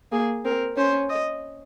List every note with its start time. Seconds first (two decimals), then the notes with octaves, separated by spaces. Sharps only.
0.12 A#3 G#4
0.45 C4 A#4
0.77 C#4 C5
1.09 D#5